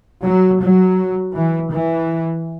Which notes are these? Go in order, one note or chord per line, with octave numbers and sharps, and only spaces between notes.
F#3
F#3
E3
E3